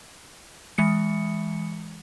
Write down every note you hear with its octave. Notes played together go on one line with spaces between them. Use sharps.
E3 G#3 C#7